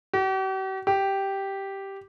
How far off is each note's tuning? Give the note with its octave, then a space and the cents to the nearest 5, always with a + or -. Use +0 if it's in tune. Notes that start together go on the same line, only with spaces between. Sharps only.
G4 -45
G4 -5